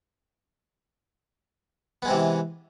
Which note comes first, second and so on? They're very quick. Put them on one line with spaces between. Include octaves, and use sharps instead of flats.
B3 G#3 C4 C3 E3